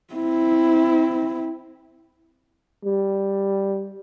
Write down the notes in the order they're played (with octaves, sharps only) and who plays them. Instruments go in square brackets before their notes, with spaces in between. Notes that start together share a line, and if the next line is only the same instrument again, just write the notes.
[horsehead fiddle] C4 E4
[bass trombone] G3